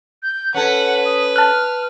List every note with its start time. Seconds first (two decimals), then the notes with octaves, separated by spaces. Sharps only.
0.23 G6
0.54 C#4 A4 B4 F#5
1.05 D#6
1.36 A5 F6 F#6